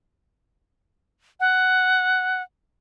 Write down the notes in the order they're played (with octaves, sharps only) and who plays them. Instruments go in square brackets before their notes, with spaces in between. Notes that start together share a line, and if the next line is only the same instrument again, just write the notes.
[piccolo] F#5